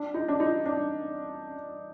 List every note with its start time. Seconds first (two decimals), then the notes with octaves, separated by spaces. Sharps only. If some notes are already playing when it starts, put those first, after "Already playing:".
Already playing: D4
0.14 D#4
0.28 D4
0.40 D#4
0.66 D4